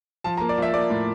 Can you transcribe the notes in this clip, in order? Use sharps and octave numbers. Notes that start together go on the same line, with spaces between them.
F3 A5
A#3 A#5
D5
F3 E5
A#3 D5
A2